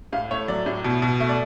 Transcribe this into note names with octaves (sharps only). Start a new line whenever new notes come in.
A2 F5
A3 C#5
F#3 D5
A2
B2
B2
A3
D5